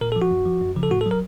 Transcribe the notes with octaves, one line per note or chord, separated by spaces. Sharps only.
A#2 A#4
A4
F3
F#4
F#2
F3
F#2
C#3 F3
A4
A2 F#4
A4
F#3
A#4